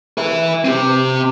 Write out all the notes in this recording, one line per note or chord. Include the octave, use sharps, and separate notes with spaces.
B4 E5
C4 G4